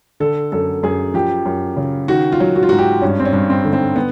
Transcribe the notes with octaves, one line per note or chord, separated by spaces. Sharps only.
D3 A4
F#2 A4
F#2 G#4
F3 G4
F#2
C#3
D#3 F#4
F4
F#3
F#4
F4
G#2 F#4
G4
G2 C#4
C4
C#4
G2
C4
D3
C4
B3